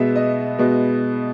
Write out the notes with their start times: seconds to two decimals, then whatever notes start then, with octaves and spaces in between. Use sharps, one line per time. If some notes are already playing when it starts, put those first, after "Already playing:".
Already playing: B2 G#3 B3 E5
0.16 D#5
0.58 B2 G#3 B3